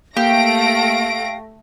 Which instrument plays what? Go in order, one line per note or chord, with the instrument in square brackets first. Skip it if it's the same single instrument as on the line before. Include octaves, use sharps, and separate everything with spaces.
[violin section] A3 A#6 D7 [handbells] A#3 [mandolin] G4 [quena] F5